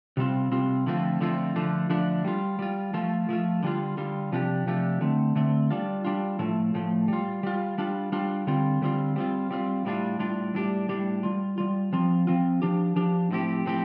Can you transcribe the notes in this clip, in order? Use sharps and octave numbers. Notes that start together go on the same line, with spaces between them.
C3 G3 C4 F4
C3 G3 C4 F4
D3 F3 A3 C4 F4
D3 F3 A3 C4 F4
D3 F3 A3 D4
D3 F3 A3 D4
G3 F4
G3 F4
F3 A3 F4
F3 A3 F4
D3 G3 F4
D3 G3 F4
C3 F3 A3 D4 G4
C3 F3 A3 D4 G4
D3 A3 C4
D3 A3 C4
G3 D4 F4
G3 D4 F4
A2 F3 A3
A2 F3 A3
G3 F4
G3 F4
G3 D4 F4
G3 D4 F4
D3 G3 C4 F4
D3 G3 C4 F4
G3 C4 F4
G3 C4 F4
A2 G3 D4 F4
A2 G3 D4 F4
A2 G3 D4 G4
A2 G3 D4 G4
G3 F4
G3 F4
F3 C4 F4
F3 C4 F4
F3 D4 G4
F3 D4 G4
A2 F3 C4 G4
A2 F3 C4 G4